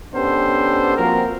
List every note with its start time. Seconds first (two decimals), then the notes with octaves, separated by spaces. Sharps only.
0.14 B3 C#4 D4 G4 A4 C5
0.97 F3 A#3 C4 F#4 A#4